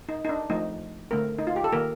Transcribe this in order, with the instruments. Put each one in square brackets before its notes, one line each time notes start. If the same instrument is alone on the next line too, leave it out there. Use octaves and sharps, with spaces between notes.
[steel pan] D#4
D#4
D4
F3 A3 C4 D#4
D3 A3 C4 A#4
D#4
F4
G4
A4
D#3 A#3 A#4